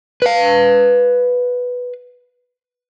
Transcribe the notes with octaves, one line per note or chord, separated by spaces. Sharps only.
B4 F5